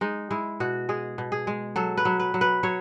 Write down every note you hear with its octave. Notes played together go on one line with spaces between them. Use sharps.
G#3 D#4
G#3 E4
B2 F#4
G#3 G#4
B2
G#4
G#3
F#3 A4
B4
F#3
B4
F#3
B4
F#3 C#5